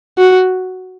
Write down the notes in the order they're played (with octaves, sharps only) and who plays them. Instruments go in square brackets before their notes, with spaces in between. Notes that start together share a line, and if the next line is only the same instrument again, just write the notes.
[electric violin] F#4